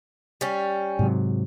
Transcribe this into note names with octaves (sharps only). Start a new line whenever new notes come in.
G3 C#4
G#2 C3 F#3